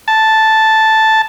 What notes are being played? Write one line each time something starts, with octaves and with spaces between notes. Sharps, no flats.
A5